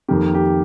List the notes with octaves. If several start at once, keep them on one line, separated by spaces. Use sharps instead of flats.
F2 D#3 A#3 G4
G4